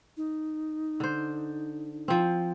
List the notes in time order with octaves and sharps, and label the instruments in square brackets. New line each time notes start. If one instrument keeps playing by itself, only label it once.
[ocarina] D#4
[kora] D3 C5
F3 C4